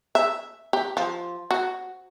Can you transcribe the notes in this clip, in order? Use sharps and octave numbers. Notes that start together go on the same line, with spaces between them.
E5
G4
F3
F#4